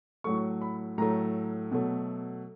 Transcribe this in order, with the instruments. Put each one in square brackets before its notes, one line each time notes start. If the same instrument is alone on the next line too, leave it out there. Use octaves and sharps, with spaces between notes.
[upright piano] A2 F#3 A3 C#6
B5
A2 F#3 A3 A#5
B2 F#3 A3